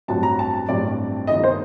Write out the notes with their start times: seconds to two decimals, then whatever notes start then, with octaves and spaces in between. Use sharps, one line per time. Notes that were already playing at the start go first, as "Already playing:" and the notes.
0.08 A1 G2 F#3 C4 F#4 A5
0.23 A#5
0.39 A5
0.54 A5
0.69 A1 G2 F#3 C4 F#4 D5
1.27 G1 G2 D#3 A3 D4 D#5
1.44 C5